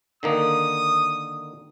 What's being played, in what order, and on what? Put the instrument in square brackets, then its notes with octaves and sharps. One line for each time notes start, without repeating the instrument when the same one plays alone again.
[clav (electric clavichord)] D3 D#3 A#3 [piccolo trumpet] D#6